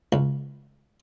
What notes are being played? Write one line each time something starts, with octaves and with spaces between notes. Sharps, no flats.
C#2